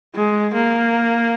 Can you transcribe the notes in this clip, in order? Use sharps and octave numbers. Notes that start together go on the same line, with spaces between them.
G#3
A#3